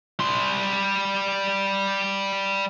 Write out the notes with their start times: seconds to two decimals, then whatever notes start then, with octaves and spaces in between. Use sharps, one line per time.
0.20 G3 C6